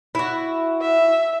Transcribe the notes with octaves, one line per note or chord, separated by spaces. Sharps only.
E4 F#4
E5